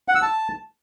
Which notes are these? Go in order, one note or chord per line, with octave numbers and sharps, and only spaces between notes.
F#5
E6
A5